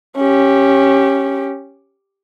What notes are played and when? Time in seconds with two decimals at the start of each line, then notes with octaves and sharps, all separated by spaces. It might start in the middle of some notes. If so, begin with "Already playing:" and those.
0.17 C#4 G4